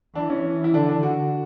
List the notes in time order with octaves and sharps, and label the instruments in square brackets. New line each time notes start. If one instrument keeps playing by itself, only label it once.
[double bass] E3 [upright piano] D4
[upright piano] C#4
E4
[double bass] D3 [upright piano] D4
[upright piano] D4
F#4